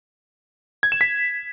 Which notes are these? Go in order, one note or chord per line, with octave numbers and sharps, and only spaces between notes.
G#6
E7
B6